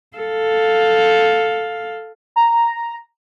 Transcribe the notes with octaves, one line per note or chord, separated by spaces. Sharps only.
A4 F5
A#5